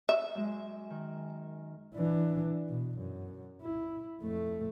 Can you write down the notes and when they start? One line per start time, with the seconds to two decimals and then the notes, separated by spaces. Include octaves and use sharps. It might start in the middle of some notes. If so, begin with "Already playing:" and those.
0.09 E5
0.35 F#2 G#3
0.90 D#3
1.95 E3 D4
2.69 B2
2.98 F#2
3.61 E4
4.21 F2 A3